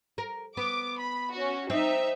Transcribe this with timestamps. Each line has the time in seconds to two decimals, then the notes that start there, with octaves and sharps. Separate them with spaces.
0.18 A#4
0.57 B3 D6
0.98 B5
1.33 C#4 F#4
1.70 C4 D#4 E5